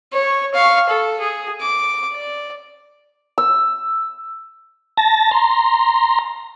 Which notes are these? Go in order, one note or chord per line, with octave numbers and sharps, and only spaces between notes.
C#5
F5 C#6
A4
G#4
D6
D5
E6
A5 A#6
A#5 C6